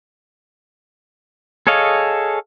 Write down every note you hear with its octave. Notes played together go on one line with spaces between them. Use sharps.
G#4 A4 C#5 D#5 F5